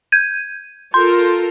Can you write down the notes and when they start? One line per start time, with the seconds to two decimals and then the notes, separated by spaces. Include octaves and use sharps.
0.12 G6 G#6 D#7
0.94 F4 A4 A#4 C6 G6